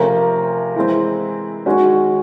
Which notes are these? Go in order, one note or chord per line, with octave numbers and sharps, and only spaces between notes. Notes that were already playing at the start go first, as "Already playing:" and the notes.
Already playing: C3 F3 A3 C#4 A#4
E3 G#3 C4 E4
D#3 G#3 C#4 F#4